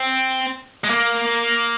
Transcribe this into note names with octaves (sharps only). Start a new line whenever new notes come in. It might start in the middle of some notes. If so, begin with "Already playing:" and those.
Already playing: C4
G#3
A#3